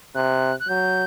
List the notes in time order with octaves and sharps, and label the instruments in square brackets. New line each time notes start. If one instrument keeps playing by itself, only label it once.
[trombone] C3 [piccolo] F#6
[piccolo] F#6
[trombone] F#3 [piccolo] G6